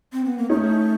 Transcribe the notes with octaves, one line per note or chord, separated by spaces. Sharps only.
C4
B3
A#3
A3 C#4 D#4